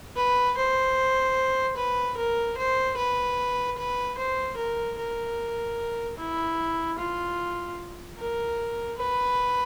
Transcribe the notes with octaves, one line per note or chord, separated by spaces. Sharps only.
B4
C5
B4
A#4
C5
B4
B4
C5
A#4
A#4
E4
F4
A#4
B4